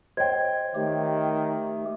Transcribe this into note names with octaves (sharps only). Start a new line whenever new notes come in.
C5 C#5 D#5 G5 G#6
D#3 A3 G4